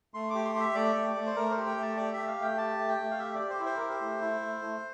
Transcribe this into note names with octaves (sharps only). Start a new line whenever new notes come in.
A3 C6
G4 D6
C6
G4 E5
A3 D5
A3
A3
C5
A3 A#4
C5
G4
G5
A3
A5
G4 D5
E5
A3
F5
A3 G5
G4 A5
A3
G5
A3
F5
G4 E5
G4 D5
C5
E4
C5
G4 A#4
C5
A3
E4
A3
A3